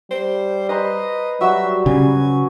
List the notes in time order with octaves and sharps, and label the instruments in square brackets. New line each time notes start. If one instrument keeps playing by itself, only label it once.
[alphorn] G3 [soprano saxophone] C5
[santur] B4 C5 A#5 [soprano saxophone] D#5
[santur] F#3 F#4 E6 [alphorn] G3 [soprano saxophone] E5
[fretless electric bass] C#3 [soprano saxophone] G#5